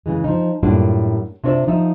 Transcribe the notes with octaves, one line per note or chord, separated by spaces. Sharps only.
C#3 E3 G#3
F3 D#4
F#2 A2 G3 A#3 D4 F4
C3 D4 F4 C#5 D5 E5
F3 D#4 D#5 E5